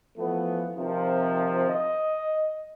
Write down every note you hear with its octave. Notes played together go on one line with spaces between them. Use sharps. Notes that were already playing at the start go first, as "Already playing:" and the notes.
E3 F3 A3 B3
C3 D#3 F3
D#5